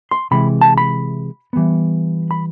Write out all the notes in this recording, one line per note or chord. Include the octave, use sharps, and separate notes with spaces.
C6
C3 E3 G#3 B5
A5
B5
E3 G3 B3
B5